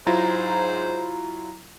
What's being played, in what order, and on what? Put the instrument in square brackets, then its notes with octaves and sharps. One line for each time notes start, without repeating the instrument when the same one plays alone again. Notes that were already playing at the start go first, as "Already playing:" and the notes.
[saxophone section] G#2 C5 [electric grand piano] F#3 E4 F4 [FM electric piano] A#5